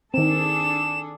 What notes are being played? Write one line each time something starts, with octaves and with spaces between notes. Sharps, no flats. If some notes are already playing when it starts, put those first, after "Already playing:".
D#3 C4 D4 G#4 A4 E7